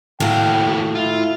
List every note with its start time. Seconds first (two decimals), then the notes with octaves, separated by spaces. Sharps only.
0.20 D#2 A2 F#4 F5 G5
0.95 E4 F4